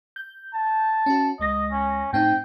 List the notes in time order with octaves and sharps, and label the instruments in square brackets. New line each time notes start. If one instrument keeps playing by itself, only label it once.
[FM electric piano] G6
[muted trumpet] A5
[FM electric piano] C#4 F#4
[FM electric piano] C#2 G#3 A#6 [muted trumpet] D#5
[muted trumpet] C#4
[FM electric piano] A2 C4 D#4 [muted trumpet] G5